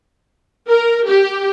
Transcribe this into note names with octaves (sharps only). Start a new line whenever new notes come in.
A#4
G4